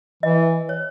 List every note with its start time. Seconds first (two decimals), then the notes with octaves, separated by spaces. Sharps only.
0.23 E3 D#5
0.69 C#5